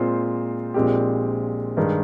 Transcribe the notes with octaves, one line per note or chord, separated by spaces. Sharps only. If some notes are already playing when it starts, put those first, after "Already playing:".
Already playing: A#2 G#3 C4 F4 C5
A#1 A#2 G#3 C4 G4
G2 D#3 G#3